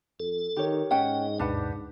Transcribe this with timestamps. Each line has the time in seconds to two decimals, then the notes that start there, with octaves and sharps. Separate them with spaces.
0.20 F2 A4
0.56 D#3 G4 C#5
0.91 G#2 C#4 D#5 F#5 G5
1.40 D2 G2 B2 D4 B4 F#5